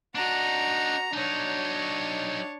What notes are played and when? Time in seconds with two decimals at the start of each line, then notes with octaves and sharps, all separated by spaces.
0.15 D4 D#4 F#4 A#5
1.14 F#3 D4 D#4 C#5